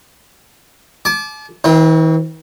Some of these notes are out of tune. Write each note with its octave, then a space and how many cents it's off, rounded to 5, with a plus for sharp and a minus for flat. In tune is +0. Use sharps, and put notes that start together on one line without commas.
A5 -40 D6 +0
E3 -45 C4 +0